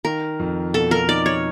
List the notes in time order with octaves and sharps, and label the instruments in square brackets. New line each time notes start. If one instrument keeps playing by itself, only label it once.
[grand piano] D#3 [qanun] A#4
[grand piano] F2
[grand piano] B2 [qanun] A4
[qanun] A#4
[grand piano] D#4 [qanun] D5
[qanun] C#5